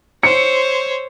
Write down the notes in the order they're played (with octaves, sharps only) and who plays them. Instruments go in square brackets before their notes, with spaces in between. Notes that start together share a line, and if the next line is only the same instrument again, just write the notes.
[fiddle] C5 C#5 [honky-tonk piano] C#7